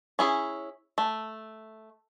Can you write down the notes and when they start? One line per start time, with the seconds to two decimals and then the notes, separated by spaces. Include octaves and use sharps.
0.19 C#4 E4 G#4
0.98 A3